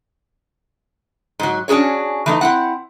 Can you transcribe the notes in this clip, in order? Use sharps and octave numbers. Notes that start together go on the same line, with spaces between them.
G#2 F#3
C#4 D4 F#4 G#4 C#5
E3 A3 D#4
C4 E4 F#5